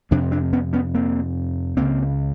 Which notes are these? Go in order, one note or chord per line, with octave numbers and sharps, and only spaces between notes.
F2 C3 C4 D4
C4 D4
B3 C#4
B3 C#4
A#3 C4
C#2 C#3 A#3 C4